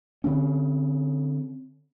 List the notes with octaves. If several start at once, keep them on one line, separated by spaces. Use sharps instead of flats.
D3 C4 C#4